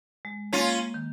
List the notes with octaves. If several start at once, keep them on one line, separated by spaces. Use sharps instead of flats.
G#3
A#3 C#4 F4
D#3